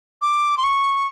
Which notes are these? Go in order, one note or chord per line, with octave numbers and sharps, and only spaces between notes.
D6
C6
C#6